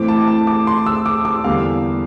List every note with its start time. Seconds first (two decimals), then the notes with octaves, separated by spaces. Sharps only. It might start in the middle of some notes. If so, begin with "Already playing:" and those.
Already playing: A2 E3 A3 C4 D6
0.08 A5
0.28 A5
0.47 D6
0.67 C6
0.86 E6
1.06 D6
1.25 D6
1.44 E2 D3 G3 A#3 F5